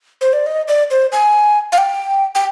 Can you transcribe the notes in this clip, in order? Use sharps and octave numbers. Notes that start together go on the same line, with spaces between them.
C5
D5
D#5
D5
C5
G#5
F5
G5
G5